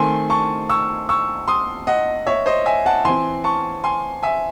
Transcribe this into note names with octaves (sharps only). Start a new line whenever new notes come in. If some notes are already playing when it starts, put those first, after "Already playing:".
Already playing: D#3 A3 C4 G#5 C6
A5 C#6
C#6 E6
C#6 E6
C6 D#6
D#5 F#5
C#5 E5
C5 D#5
E5 G#5
F#5 A5
E3 C4 G#5 C6
A5 C#6
G#5 C6
E5 G#5